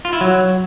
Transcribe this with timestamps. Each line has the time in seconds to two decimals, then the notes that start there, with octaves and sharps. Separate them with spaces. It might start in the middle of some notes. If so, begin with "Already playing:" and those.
0.05 F4
0.13 E4
0.21 F#3